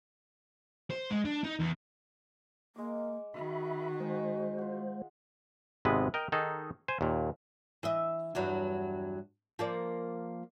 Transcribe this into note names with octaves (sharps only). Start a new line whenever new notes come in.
C5
G#3
D4
D#4
E2
G#3 A#3 D6
D#3 F#4 E5 B5
G#3 G#4 C5 D#5 G#5
F4 F#5
G#1 C3 G#3 B3 B4
A#4 D#5 G5
D#3 D#4 G#4 A4
C5 G#5
D#2 A#2
E3 D#5 E5
E2 G2 F#3
F3 A#3 D5